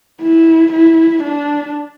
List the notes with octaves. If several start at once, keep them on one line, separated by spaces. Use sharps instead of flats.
E4
E4
D4